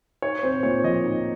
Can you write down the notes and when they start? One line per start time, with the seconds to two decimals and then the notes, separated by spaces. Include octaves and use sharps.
0.22 D#4 C#5
0.43 C4 C5
0.63 A#2 C#5
0.84 F3 D#5
1.04 D#4